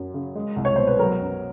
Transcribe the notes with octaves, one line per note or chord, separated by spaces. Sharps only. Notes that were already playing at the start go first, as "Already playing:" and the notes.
Already playing: F#2 F#3
C#3
G#3
C2
C#5
B2 C5
B4
F#3 A#4
F#2